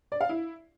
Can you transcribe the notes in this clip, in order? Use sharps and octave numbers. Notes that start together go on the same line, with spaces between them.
D5
F5
E4